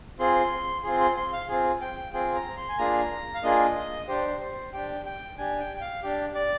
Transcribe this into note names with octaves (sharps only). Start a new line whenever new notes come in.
C4 F4 G#4 C6
C4 F4 G#4 C6
C6
C6
F5
C4 F4 G#4
G5
C4 F4 G#4 G5
A#5
C6
G#5
A#3 D4 F4 G#4 A#5
F5
A#3 D4 F4 G#4 D#5
D4 G4 C5
C5
D4 G4 G5
G5
D4 G4 G#5
G5
G5
F5
D4 G4
D5